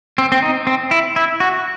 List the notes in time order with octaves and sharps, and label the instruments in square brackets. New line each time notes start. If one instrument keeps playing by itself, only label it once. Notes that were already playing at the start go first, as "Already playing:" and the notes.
[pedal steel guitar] C4
C4
D#4
C4
E4
E4
F#4